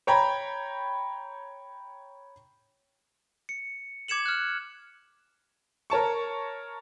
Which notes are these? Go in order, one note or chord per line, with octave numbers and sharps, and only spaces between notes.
C#5 G5 A#5 B5
C#7
D6 G#6 C#7 E7 F#7
F6 F#6
A#4 C#5 A5 C#6